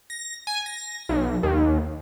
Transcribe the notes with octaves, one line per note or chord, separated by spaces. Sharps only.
A#6
G#5
A#6
B1
D#2